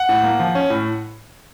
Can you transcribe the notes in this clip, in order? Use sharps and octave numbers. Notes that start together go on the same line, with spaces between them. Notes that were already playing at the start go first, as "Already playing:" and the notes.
Already playing: F#5
A2
A#3
F3
C#4
A2